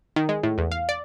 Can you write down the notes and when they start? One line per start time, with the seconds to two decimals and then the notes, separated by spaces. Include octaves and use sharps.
0.16 D#3
0.29 G#3
0.43 A2
0.58 E2
0.72 F5
0.89 D5